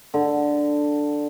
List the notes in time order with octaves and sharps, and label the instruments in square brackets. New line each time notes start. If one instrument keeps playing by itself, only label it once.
[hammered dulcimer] D3